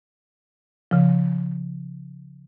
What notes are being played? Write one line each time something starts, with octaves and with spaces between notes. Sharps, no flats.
C#3 F3